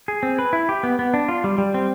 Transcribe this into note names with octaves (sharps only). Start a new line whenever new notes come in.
G#4
C4
B4
E4
G4
B3
B3
D4
F4
G3
G3
C4